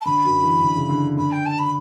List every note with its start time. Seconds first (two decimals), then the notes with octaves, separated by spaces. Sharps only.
0.01 A5
0.05 D3 B5
0.25 F#2
0.43 E3
0.61 D3
0.76 C#3
0.89 D3
1.17 D3 B5
1.32 G5
1.46 A5
1.59 B5